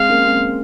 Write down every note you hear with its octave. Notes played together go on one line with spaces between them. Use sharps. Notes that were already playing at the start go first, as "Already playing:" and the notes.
Already playing: G#3 C4 F5
A#3 C#4
G#3 C4